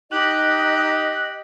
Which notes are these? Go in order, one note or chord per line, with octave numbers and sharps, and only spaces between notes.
D#4 G4 D#5 F#6